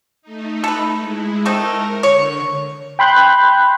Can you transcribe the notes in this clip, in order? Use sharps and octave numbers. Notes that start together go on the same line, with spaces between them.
A3 D#4
A4 B4
G#3 E4
A3 C4 D#4 A#4
D3 C#5
G5 B5 C6 F#6 G6